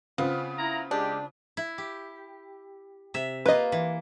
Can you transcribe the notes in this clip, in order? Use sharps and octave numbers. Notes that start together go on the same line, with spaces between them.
C#3 B3 C4 F4
E4 A#5
G#3 D4 G4
E4
G4
C3 E5
A#3 F4 B4 D#5
E3